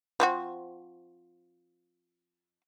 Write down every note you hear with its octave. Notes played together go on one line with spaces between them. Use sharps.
F3 C4 F#4